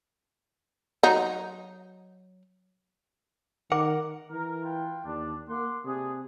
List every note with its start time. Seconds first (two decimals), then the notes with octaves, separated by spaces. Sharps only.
1.03 F#3 D#4
3.72 D#3 A#4 F#5 D6
4.31 E3 A#4
4.63 F4 B4 G5
5.04 D#2 D4
5.49 A#3 F#5 C6 D6
5.85 C3 D4 G#4